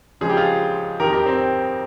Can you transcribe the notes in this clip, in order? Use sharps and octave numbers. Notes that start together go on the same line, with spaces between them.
C#2 C#3 F3 G#4
G4
F4 G#4
F2 D#3 G4 A#4
G4 A#4
C4